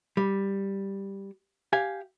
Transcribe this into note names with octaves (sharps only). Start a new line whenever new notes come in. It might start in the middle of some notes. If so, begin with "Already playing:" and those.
G3
G4 F5 G#5